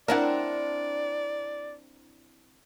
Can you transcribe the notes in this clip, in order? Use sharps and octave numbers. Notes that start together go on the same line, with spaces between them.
C4 D4 E4 A#4 D5 F#5